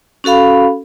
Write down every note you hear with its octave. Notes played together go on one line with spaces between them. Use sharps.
C#4 F#4 A4 F5 B5